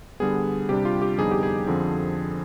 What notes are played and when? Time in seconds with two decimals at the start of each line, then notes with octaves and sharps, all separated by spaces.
0.20 D3 G3 B3 G#4
0.69 C3 G3 D4 G4
0.85 F4
1.02 G4
1.18 F2 D3 G3 B3 D#4 G#4
1.31 G4
1.43 G#4
1.67 F2 D3 F3 C4